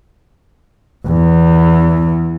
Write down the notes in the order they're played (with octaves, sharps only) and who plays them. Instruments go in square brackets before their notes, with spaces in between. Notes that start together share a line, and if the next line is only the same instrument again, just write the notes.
[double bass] E2